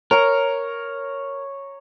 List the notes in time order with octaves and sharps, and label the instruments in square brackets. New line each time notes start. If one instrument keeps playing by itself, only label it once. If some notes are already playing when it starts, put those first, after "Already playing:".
[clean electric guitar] A#4 [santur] C#5 A#5